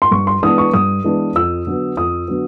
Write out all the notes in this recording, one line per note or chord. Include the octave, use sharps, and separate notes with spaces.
C6
G2 C#6
C6
E3 G#3 B3 D4 D#6
C#6
G2 D#6
E3 G#3 B3 D4
F2 E6
D3 F#3 B3
F2 D#6
D3 F#3 B3